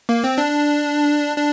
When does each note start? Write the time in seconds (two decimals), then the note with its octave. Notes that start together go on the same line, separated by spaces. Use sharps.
0.09 A#3
0.24 C4
0.38 D4
1.36 D4